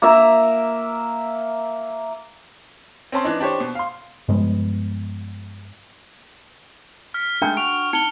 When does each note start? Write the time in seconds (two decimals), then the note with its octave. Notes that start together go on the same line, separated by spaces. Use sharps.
0.02 A#3 E5 A#5
3.12 C4 C#4 A5 C6
3.24 E3 D4 D#4
3.40 D4 G4 C5 C#5
3.60 B2
3.75 F5 C6
4.28 G2 F3 G#3 B3
7.14 F6 B6
7.42 G#3 A3 D4 D#4 A#4 G5 G6
7.57 F#4 D7 F7
7.93 D#4 C#7 G7